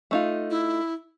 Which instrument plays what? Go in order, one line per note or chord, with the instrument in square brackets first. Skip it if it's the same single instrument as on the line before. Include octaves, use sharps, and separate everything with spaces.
[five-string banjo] A3 D#4 F4
[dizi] E4